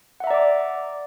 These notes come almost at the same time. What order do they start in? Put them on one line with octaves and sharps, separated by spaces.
F#5 E5 A#5 D5 D6